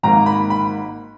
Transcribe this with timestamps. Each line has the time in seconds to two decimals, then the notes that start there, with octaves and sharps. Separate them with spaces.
0.03 G#1 G#2 D#3 A#3 A#5
0.26 B5
0.50 B5